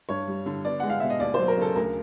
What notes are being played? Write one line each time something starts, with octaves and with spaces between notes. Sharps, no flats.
G2 C#5
G3
D3
B3 D5
G#3 F#5
F5
B2 E5
D#5
D#2 D5
F#3 C5
A#4
C#3 A4
D2 A#4